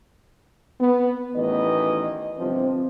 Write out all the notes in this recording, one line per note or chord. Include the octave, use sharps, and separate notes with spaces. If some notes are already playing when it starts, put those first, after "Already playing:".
B3
A1 E2 D#3 B4 D#5
G1 C3 F3 C4